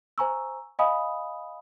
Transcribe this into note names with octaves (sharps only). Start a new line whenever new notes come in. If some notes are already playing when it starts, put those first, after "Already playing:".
C5 G#5 A#5 C#6 E6
D#5 F5 G#5 B5 D#6